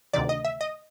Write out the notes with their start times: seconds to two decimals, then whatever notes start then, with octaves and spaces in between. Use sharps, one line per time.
0.13 D2 C3 D#3 D5
0.29 D#5
0.45 E5
0.61 D#5